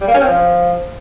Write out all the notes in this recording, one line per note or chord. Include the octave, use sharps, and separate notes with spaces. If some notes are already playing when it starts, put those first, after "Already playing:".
G3
A#3
C#4
C4
F3